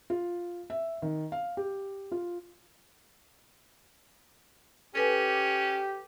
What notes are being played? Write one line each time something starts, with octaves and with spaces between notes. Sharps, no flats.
F4
E5
D#3
F5
G4
F4
C#4 G4 A4 B4 G#5